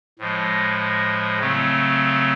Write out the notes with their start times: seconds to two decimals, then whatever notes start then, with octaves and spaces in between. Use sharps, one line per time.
0.19 A2 F3 G#3
1.39 C#3 F#3 A3 C4